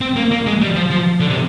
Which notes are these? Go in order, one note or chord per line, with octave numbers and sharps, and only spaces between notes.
C4
A#3
A#3
G#3
G3
F3
F3
D3
C3